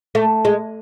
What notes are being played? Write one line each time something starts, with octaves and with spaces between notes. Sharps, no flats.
A3
G#3